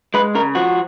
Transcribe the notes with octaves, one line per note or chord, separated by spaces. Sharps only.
G#3 B4
C#3 A#4
F3 F#4